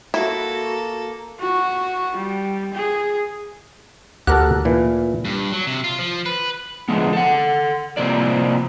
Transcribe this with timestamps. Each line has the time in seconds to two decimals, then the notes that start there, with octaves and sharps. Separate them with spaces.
0.14 A#3 E4 F#4 A4
1.40 F#4
2.17 G3
2.74 G#4
4.27 D2 G4 A4 A#4 F#5 F#6
4.65 A#2 E3
5.25 G2
5.52 F#3
5.67 C3
5.84 F4
5.99 F3
6.26 B4
6.89 D3 F3 G#3 B3
7.13 A4 F#5
7.97 C3 F3 A#3 C4 D5